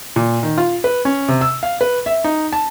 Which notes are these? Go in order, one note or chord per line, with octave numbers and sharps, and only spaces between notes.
A#2
D#3
F4
B4
C#4
C3
E6
F5
B4
E5
D#4
A5